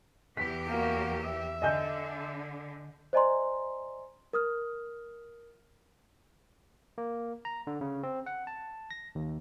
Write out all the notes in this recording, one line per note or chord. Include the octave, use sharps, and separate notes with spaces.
E2 G4 B6
A#3 F#4
E5
D3 D#5 G#5 G6
C5 D5 D#5 G#5 A#5 C6
A#4 D#6 F6
A#3
A#5
D3
C#3
C4
F#5
A5
A#6
D#2